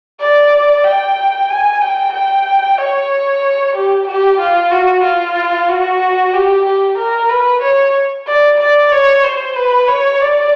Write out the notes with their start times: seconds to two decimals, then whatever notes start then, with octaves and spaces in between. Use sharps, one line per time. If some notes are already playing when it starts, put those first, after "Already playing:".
0.20 D5
0.84 G5
1.49 G#5
1.81 G5
2.13 G5
2.78 C#5
3.75 G4
4.07 G4
4.40 F4
4.72 F#4
5.03 F4
5.69 F#4
6.33 G4
6.65 G4
6.98 A#4
7.29 B4
7.62 C#5
8.27 D5
8.60 D5
8.92 C#5
9.24 C5
9.56 B4
9.88 C#5
10.21 D5